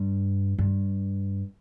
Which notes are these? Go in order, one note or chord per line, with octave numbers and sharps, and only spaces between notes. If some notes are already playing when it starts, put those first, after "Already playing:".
Already playing: G2
G2